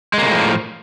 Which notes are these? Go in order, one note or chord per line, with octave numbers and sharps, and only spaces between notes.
A2 C#3 F3 G#3 A#3